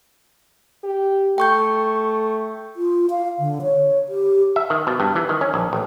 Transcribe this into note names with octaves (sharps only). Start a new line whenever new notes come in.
G4
A3 G5 C#6 G6
F4
F5
D3
C#5
G4
E5
D#3
B2
G2
E3
D#3
C#4
A#1
A1